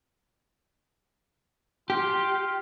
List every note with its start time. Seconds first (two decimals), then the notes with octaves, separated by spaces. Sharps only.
1.90 F4 G4